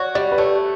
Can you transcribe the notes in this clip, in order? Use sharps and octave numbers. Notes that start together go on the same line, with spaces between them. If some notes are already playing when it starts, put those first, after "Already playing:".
Already playing: F#4 C#5 D5
G3 D5
B4
A3 C#5